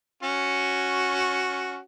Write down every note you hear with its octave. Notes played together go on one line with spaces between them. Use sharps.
C#4 F#4